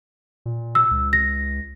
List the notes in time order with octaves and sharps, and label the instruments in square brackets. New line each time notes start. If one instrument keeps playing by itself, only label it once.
[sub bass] A#2
[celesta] E6
[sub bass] C#2
[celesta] A#6